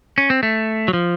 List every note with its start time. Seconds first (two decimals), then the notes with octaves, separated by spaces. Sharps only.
0.18 C#4
0.30 C4
0.43 A3
0.88 F#3
0.93 F3